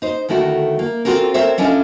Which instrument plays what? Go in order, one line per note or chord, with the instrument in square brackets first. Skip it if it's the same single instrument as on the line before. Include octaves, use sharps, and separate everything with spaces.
[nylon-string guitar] D#4 C5
D2 D#3 A3 E4 F#4
A#3
C4 C#4 F4 F#4 A4 A#4
C4 A4 A#4 C5 C#5 E5
C#4 D4 E4 F4 A4 D#5